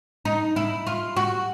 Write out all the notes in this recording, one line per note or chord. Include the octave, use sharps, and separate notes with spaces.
D#4
E4
F4
F#4